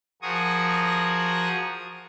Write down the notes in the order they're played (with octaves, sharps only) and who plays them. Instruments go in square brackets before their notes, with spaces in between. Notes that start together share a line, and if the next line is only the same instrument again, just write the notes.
[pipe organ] F3 F#4 G#4 A#4 C#6 D#6